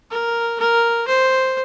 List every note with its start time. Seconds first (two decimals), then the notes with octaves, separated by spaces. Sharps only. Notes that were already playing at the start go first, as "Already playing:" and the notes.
0.11 A#4
0.59 A#4
1.08 C5